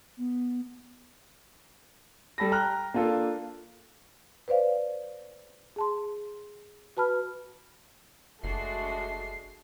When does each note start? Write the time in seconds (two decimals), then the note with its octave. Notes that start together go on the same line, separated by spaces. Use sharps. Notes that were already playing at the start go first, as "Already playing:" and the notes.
0.18 B3
2.38 G3 A4 B5 A#6
2.52 G5 A#5 F6 F#6
2.94 A#3 D4 F4 A4
4.48 B4 C5 D5 F5
5.76 G#4 A5 C6
6.97 F#4 B4 A5 B5 F6
8.44 F#1 G#3 A3 D4 F#4 C7